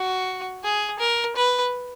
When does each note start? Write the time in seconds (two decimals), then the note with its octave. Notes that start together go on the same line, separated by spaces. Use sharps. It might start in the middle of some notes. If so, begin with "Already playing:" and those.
Already playing: F#4
0.64 G#4
0.99 A#4
1.36 B4